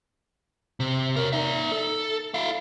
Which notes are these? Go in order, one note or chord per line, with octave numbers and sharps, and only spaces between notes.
C3
A#4 C#5
D#4 E5
A4
E4 F5